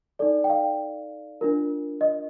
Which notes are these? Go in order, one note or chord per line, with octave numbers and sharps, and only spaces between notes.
D#4 A4 D5
G5
F5
D4 F4 A#4
D#5